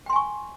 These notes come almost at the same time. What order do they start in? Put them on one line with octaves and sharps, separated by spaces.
G5 C6 G#5 C#6